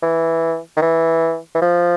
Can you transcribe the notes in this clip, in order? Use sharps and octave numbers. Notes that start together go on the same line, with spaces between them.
E3
D#3
E3
E3
F3